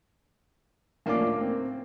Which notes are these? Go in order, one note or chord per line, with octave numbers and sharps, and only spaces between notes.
A2 A#3 C#4 D4 F4 D6
A#3 C4